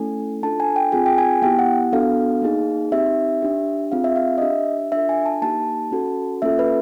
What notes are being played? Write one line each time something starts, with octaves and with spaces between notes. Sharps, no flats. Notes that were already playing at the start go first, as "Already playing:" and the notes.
Already playing: A3 C#4 E4 A4 G#5
D4 F4 A4 A5
G#5
G5
C4 F4 G#4 G#5
G5
G#5
B3 E4 G4 G5
F#5
B3 D4 F#4 A4 F5
A#3 D#4 G#4
C4 D#4 G4 E5
D4 G4
C4 F4 G#4 F5
E5
F5
D#5
D4 G4 E5
D4 F4 A4 E5
G#5
A5
A#3 D#4 G4 A5
C#4 F#4 A4
A#3 C#4 F4 A4 E5
B4